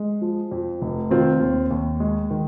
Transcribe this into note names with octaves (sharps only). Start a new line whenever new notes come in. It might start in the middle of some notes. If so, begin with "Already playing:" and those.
Already playing: G#3
F3
F2
F1
D#3 C4 F4
D#2
D#2
G#3
D#3